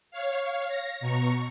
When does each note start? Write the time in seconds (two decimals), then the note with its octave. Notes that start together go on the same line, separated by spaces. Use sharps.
0.11 C#5 F5
0.68 A#6
1.01 B2 A#5 C#6